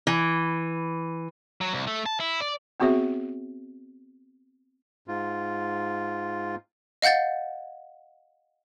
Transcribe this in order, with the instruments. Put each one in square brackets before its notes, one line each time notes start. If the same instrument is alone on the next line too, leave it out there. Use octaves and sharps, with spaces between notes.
[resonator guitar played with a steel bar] E3
[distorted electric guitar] F#3
C2
A3
A5
E4
D5
[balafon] B3 C4 F#4 G#4 C#5 E5
[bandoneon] G#2 F4
[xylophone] D#5 F5 F#5 G6 A6